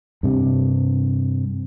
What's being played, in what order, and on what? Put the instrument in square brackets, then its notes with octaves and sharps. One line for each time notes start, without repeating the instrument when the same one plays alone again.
[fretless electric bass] G2 C3